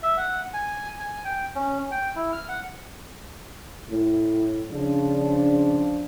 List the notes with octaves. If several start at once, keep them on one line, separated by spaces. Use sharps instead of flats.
E5
F#5
G#5
G#5
G5
C#4
G5
E4
F6
F#5
A2
C#3 F3 D4